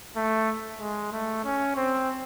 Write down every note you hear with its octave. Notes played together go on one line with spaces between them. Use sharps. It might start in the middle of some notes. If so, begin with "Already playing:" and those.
A3
G#3
A3
C#4
C4